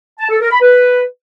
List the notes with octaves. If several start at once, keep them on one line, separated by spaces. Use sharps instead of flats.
A5
A4
A#4
B5
B4